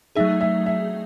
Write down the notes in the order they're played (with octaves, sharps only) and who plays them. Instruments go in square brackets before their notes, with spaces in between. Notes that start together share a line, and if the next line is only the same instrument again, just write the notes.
[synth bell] F#3 A3 D#4 G#4 [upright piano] E5
[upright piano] E5
E5